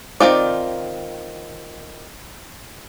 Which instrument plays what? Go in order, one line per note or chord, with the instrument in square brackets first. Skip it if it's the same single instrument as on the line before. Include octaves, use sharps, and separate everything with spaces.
[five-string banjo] D#3 C4 F4 D5